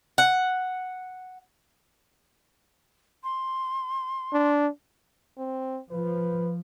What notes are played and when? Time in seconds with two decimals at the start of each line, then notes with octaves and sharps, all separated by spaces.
0.18 F#5
3.24 C6
4.33 D4
5.38 C4
5.91 F3 B4